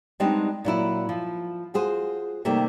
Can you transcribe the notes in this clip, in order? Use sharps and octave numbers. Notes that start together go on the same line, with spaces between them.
G3 G#3 B3 C4 D4 D#4
A#2 F#3 E4
F3
F4 F#4 G#4 C5
C3 D#3 G3 A3 A#3